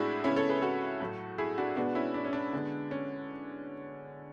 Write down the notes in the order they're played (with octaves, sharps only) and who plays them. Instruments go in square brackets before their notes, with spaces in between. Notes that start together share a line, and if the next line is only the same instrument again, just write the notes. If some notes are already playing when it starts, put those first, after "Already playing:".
Already playing: [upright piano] A2 G#3 D4 E4 F#4 G#4
C#3 G#3 B3 C#4 E4
A4 C#5
G#4 B4
F#4 A4
A2 F#3 A3
E4 G#4
D4 F#4
B2 G#3 B3 D4 F#4
C#4 E4
D4
C#4
D4
D3 G#3 B3
C#4